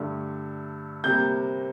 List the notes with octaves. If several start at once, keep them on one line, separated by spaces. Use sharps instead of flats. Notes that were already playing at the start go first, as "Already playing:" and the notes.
Already playing: G2 D3 A3
C3 G3 A#3 G6